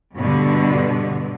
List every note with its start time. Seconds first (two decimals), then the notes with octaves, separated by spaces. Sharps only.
0.17 G2 B2 D3 G3